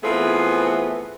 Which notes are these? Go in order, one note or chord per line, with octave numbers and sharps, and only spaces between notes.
E3 A3 B3 C4 F4 G#4